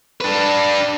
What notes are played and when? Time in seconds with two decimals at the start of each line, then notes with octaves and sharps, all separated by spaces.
0.21 D4 B4